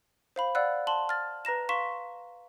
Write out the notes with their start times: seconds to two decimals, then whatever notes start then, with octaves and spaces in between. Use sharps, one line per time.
0.36 C5 F5 B5
0.55 D5 F5 F#5 E6 F#6
0.87 A5 C6 F#7
1.09 F6 A6
1.45 B4 A#5 A#6 E7
1.69 F5 C6 C#6 B6 E7